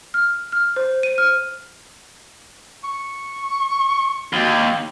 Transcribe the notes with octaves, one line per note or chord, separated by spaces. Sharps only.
F6
F6
C5
D#7
F6
C#6
D#2 F#4
G4